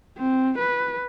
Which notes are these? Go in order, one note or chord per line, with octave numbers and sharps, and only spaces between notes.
C4
B4